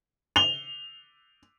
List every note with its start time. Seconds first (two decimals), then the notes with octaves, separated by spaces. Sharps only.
0.36 F7 G7